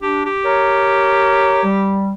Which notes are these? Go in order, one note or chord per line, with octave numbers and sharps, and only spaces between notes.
D4 G4
G4
A#4 C#5
G3